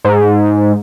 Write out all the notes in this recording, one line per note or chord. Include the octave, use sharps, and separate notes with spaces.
G#2